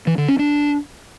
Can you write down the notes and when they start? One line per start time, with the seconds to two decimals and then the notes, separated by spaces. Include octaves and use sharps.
0.07 E3
0.18 D3
0.28 C#4
0.39 D4